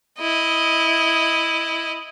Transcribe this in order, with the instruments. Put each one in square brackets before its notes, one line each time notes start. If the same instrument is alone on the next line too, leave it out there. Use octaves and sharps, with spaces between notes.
[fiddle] E4 D#5